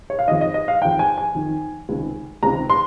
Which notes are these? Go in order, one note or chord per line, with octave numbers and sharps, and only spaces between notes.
C#5
F5
F2 D#3 D#5
D#5
D#5
F5
F2 D#3 G5
G#5
G#5
F2 D#3
C#2 C3 D#3
C#2 C3 D#3 A#5
C6